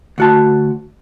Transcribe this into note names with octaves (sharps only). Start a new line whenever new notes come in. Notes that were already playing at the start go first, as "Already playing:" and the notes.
D2 F#4 A5